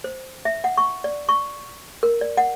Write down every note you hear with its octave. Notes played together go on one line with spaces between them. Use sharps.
C5
E5
F#5
C#6
D5
C#6
A#4
D5
F#5